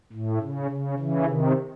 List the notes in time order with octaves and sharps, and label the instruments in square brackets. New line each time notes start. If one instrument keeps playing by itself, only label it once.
[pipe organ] A2
C#3
C#3
C#3 E3
C3 D#3